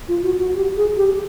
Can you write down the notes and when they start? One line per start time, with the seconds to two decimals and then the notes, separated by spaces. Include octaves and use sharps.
0.08 F4
0.24 F#4
0.40 F#4
0.55 G4
0.77 G#4
0.97 G4